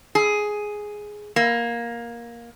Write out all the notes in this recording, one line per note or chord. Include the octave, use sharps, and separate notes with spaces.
G#4
A#3